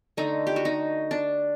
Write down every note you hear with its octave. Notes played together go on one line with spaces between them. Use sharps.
D3 A3 D#4
G4
F#4
D#4
D4